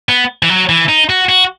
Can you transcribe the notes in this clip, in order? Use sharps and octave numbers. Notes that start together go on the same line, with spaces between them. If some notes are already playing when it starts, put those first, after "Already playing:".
B3
E3
F#3
E3
D#4
F#4
F#4